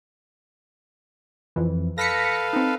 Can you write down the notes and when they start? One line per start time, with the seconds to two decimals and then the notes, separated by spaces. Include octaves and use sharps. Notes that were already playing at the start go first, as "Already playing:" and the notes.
1.56 F2 E3
1.98 A4 B4 F5 A#6 B6 C#7
2.53 C4 D#4